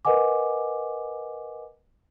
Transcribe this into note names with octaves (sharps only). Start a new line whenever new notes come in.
A#4 B4 D#5 F#5 G#5 D6